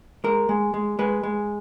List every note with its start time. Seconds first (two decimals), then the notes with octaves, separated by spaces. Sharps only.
0.24 G#3 A#4
0.49 G#3
0.74 G#3
0.99 G#3 B4
1.23 G#3